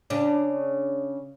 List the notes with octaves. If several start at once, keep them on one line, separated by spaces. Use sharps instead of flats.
C#3 D4